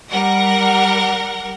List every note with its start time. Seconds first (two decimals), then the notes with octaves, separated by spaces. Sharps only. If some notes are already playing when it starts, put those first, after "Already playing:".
0.11 G3 A#4 F#5 A#6